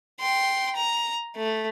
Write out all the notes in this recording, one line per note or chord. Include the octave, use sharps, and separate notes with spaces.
G5 C6
A#5
A3